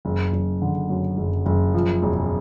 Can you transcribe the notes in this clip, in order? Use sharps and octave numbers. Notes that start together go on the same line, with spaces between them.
F#1
F#1
D3
F#2
F#1
F#1
F3
E1